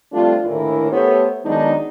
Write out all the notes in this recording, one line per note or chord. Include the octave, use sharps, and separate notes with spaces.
F3 G3 A3 C4 D4 F4
D#2 A2 D3 E3 E4 A#4
A3 B3 G4 A4 C5 C#5
D#3 F#3 G#3 B3 D4 D#4